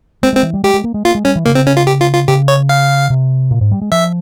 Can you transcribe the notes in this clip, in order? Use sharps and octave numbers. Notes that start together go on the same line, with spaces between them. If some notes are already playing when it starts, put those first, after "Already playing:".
G#3 C4
G#3 C4
E3
G3
G#3 G4
G#3
A#3
G#3
A#3 F4
G#3
G3 C#4
E3
C#3 A#3
C4
C#4
F4
G4
F4
F4
C#3 G4
C#5
F5
C3
A#2
G#2
G3
G#3
F3 E5